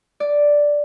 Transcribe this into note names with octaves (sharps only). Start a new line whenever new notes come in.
D5